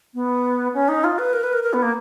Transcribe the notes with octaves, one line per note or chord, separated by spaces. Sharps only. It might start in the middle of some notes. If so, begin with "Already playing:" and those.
B3
C#4
D#4
F4
B4
A#4
B4
A#4
A#4
B3
A#3